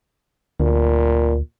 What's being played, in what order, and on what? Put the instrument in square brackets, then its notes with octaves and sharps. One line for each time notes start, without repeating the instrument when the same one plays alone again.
[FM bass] D2 [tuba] A#2